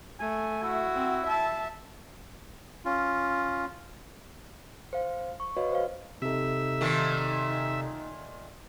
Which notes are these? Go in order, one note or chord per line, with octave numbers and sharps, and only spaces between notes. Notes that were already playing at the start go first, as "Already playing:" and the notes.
A3 G#5
E4 F#4
C4
E5 A5
C#4 F4
C5 F5
C#6
F#4 B4 C#5 D#5 F5
C5 C#5 F5
C3 D#4 A4 E5
A#2 D#3 A3